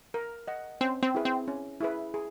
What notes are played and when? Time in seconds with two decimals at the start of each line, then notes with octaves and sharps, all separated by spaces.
0.14 A#4
0.47 D#5 F#5
0.81 C4 C#4
1.03 C4
1.15 E4 G#4 B4
1.25 C4
1.48 C#4
1.81 E4 G#4 B4
2.14 G#4